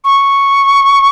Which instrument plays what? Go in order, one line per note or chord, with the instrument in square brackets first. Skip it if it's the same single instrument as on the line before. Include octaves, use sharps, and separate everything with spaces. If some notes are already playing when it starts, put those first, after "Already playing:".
[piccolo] C#6